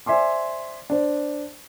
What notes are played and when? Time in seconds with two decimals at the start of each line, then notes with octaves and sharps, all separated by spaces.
0.06 C5 D5 E5 G#5 C6 D6
0.90 D4 C5